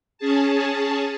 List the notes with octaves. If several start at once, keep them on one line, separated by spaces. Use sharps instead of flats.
C#4 G#4 A5